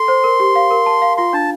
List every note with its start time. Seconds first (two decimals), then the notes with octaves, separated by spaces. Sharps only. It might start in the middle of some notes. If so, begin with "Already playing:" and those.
Already playing: A4 C6
0.08 C5
0.24 A#4
0.40 G4
0.55 F5
0.71 A#4
0.86 A5
1.02 F5
1.17 F4 C6
1.33 D4 A5